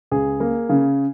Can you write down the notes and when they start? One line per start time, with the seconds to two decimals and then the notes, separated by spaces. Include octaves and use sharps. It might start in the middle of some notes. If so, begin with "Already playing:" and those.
0.11 C#2 G#4
0.40 A#3
0.69 C#3